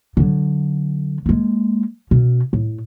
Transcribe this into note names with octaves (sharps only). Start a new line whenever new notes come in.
D3 F#3
G#3 A#3
B2 C#4
A2